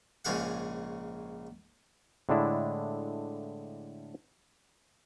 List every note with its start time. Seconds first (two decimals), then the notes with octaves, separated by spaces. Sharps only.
0.25 A#1 G#2 C#3 G#4 F5 F#5
2.29 A2 D3 G#3 D4 E4